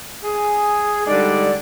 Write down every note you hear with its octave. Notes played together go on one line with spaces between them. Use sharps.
G#4
D3 G3 G#3 D#4 D5